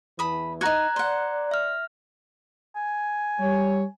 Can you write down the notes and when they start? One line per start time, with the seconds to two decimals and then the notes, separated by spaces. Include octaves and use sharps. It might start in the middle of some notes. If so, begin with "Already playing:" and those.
0.19 E2 E3 A5 B5 D#6
0.61 D#4 F#4 A#5 F#6 G#6
0.96 C5 D5 F#5
1.51 E5 F6
2.76 G#5
3.40 G3 C#5